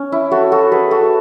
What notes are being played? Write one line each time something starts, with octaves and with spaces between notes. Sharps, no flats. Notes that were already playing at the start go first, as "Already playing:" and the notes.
Already playing: C#4
E4
F#4 A4
F#4 A4
G#4 B4
F#4 A4